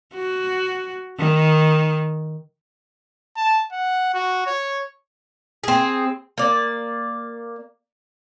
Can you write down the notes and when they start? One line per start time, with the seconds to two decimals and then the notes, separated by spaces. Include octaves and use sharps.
0.14 F#4
1.19 D#3
3.36 A5
3.72 F#5
4.14 F#4
4.47 C#5
5.64 C4 G#4
6.38 A#3 D5